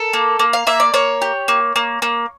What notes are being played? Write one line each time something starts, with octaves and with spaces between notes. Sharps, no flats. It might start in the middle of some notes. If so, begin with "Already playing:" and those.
Already playing: A4 A#4
A#3
A#3
F5
A#3 E5
D5
A#3 C#5
G4
A#3
A#3
A#3